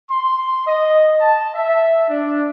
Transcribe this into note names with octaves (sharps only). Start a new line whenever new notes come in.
C6
D#5
A5
E5
D4